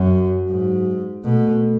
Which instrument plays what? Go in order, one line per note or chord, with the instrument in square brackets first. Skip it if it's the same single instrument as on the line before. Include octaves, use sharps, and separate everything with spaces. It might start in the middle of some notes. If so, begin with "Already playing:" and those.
Already playing: [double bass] F#2 [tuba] F#3
[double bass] G#2
[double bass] B2 [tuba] A3